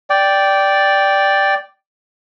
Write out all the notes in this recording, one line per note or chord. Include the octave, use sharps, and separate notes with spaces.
D5 G5